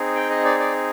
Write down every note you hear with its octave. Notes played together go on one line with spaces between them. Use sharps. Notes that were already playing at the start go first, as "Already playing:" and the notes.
Already playing: C4 D#4 G#4
G5
D#5
D5
D5